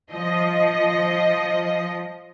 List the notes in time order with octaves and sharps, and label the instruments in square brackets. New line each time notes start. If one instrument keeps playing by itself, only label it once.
[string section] F3 D#5